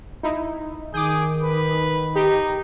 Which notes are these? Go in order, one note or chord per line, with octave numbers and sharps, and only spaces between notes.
D#4 E4
D#3 G#4 D6 D#6 G6
B4
D#4 G4